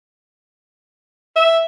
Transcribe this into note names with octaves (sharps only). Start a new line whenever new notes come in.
E5